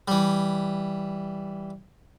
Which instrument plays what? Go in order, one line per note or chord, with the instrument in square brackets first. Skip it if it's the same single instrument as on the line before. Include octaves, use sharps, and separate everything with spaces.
[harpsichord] E3 G3